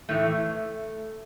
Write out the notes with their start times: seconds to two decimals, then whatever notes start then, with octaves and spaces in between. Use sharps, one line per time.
0.09 A2 E3 A3